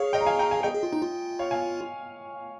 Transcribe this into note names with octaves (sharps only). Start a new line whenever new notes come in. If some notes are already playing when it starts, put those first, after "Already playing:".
Already playing: G#4 C#5 F5
D#5 G5
A#5
F5 G#5
G5 A#5
F5 G#5
G#4 D#5 G5
G#4
F4
D#4
F4
C#5 F5
F5 G#5